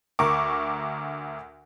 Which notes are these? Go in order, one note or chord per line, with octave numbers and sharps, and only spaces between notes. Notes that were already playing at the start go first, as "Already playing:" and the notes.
D2 A#4 C#6 D6